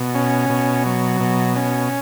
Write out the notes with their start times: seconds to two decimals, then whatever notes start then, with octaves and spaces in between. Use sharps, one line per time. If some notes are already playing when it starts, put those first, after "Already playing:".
Already playing: B2
0.15 C#4
0.50 B2
0.86 F#3
1.21 B2
1.56 C#4